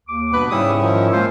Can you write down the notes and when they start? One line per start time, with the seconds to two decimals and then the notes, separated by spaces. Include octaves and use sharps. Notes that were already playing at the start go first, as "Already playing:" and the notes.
0.08 D#2 D6
0.32 G2 B2 B3 B4
0.50 G#2 C#3 G3 C#4 E4 D#6
0.82 D#3 F3
1.13 A#2 G#3 F4 C5